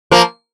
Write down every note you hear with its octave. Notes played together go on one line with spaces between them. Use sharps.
F3 A#3